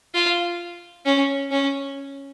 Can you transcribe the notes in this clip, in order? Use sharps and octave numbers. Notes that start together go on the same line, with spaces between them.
F4
C#4
C#4